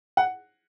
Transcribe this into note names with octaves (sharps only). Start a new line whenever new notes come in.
F#5